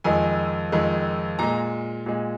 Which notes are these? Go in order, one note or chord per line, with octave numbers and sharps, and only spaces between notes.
F2 D#3 G#3 G#5
F2 D#3 G#3
A#2 G#3 A#5
A#2 G#3